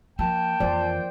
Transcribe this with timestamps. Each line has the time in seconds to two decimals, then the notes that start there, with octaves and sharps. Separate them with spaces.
0.19 F3 A#3 G5 A5
0.60 F2 E3 F3 C5 D5